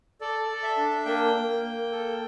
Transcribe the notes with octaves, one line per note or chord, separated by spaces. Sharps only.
A4 D5
A4
E5
D4
A#3 G5
A#3
A#3
A4